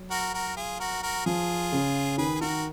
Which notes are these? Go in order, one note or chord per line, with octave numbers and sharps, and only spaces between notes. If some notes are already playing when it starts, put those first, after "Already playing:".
Already playing: F#3
F#4 A#4
F#4 A#4
F4 G#4
F#4 A#4
F#4 A#4
F3 F4 G#4
C#3
D#3 G#4 B4
G#4
D#3 F#4 A#4